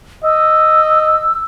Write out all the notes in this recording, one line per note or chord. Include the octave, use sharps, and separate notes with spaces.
D#5 E6